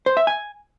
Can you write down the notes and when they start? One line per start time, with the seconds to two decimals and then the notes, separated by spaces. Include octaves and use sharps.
0.06 C5
0.17 E5
0.27 G#5